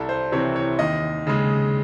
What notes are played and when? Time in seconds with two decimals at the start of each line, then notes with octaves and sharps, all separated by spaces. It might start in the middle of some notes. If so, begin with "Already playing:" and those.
Already playing: C2 A4
0.09 C5
0.32 C3 E3 C4 C#5
0.56 C#5
0.79 D#2 D#5
1.27 C#3 G#3